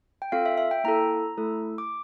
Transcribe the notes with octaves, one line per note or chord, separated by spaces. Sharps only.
G5
C4 F4 A4 F5
E5
E5
G5
A#3 E4 A4 A#5
A3 E4 A4
D6